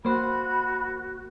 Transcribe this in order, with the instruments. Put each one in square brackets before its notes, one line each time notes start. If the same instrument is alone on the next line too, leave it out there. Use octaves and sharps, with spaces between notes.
[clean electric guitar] A#3 C5 [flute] F#4 [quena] B5